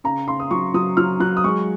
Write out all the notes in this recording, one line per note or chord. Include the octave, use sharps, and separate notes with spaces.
C#3 A#5
C#3 C6
D#6
F#3 C#6
F#3 D#6
F#3 F6
F#3 F#6
D#6
G#3 C#6